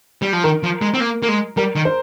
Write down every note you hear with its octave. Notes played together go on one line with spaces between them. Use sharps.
G3
F3
D#3 A#4
F3
G#3
C4
A#3
A#3
G#3
G3 A#4
D#3
C5